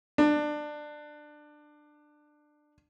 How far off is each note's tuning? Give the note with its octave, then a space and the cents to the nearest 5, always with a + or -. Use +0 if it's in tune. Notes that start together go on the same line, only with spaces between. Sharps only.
D4 +20